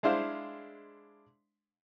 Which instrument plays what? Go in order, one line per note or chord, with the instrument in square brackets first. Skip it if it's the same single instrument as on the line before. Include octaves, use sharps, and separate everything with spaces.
[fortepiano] G#3 D4 E4 C5 F5